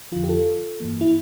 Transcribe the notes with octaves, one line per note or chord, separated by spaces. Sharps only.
F2 D3 F3 F4
G4
F4 A4
G2 E3 A#3
E4